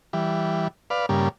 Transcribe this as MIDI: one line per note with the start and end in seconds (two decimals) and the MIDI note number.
0.13 0.68 52
0.13 0.68 55
0.90 1.06 71
0.90 1.06 74
0.90 1.06 77
1.09 1.29 43
1.09 1.29 49
1.09 1.29 55
1.09 1.29 58